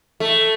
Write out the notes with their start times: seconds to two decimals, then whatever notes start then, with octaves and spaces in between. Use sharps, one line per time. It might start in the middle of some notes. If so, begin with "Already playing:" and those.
0.20 A3